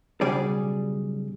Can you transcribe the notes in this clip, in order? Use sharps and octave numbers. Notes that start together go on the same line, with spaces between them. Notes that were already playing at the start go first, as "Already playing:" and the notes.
B1 C#3 G3 G#4 D5